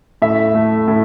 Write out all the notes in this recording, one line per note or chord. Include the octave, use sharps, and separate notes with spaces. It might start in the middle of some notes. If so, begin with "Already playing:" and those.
A2 E5
A3
A2